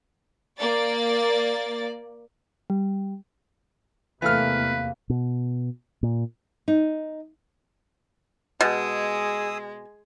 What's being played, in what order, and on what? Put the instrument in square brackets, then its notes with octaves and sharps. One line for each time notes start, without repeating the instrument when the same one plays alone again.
[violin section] A#3 D5 A6
[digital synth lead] G3
[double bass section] E2 C3 A#3 [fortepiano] E3 A3 F6 [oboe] B4 [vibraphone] F5
[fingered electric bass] B2
A#2
[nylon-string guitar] D#4
[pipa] B2 [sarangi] G#3 [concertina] G#4 D#6 E6